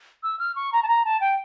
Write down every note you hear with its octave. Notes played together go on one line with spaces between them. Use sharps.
E6
F6
C#6
A#5
A5
A#5
A5
G5